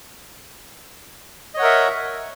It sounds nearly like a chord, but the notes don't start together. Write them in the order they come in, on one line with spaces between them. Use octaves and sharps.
D#5 C#5 F#5 A#4 E5